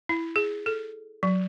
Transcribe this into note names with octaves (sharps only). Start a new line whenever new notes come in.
E4
G#4
A4
F#3